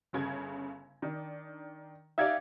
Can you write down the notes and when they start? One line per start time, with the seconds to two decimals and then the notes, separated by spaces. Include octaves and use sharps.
0.13 G1 C#3 G#6
1.02 D#3 D4
2.18 D#4 G4 D5 E5 F5 G#6